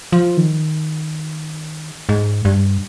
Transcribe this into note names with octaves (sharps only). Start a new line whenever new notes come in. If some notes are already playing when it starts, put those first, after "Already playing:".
F3
D#3
G#2
G2